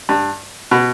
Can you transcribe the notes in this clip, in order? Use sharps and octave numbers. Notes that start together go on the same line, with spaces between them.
G2
B2